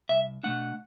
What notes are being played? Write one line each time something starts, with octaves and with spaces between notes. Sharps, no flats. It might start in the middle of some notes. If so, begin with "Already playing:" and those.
C2 E5
B2 A3 D4 F#5